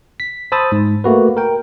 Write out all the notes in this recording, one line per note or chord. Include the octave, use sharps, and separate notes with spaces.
B6
C5 A5 B5 D#6 E6 A6
G#2
A3 A#3 F#4 B4
A#4 G5